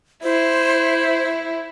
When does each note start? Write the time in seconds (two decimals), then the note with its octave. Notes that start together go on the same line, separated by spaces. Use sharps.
0.23 E4 C5